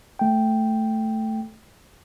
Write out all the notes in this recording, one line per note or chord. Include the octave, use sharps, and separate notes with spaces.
A3 G5